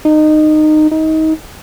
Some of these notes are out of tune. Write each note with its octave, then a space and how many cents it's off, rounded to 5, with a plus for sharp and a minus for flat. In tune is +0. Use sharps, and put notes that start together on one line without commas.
D#4 -20
D#4 +25